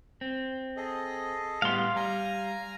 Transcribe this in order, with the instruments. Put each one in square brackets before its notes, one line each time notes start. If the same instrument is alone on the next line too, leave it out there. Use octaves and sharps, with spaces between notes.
[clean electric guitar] C4
[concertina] G#4 A4 D#5
[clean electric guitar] A2 G3 B3 [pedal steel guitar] F5 C6
[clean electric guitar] G3 [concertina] G#5 A#5